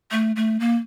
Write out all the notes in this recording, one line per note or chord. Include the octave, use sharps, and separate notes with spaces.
A3
A3
A#3